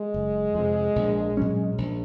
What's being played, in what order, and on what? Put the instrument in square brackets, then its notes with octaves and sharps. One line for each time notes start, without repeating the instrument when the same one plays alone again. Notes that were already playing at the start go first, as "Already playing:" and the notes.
Already playing: [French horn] G#3
[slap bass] F#1
F2 C3
A#1
A#2 F#3 C#4
A#1